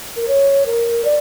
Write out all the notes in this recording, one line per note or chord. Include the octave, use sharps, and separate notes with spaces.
A#4
C#5
A#4
D5